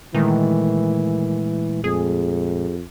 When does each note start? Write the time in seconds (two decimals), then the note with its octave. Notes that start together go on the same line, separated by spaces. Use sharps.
0.15 A#2 D#3 E3 G#3 A3
1.84 F2 G#4